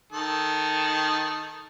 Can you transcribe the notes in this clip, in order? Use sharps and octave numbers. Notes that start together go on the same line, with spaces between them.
D#3 A4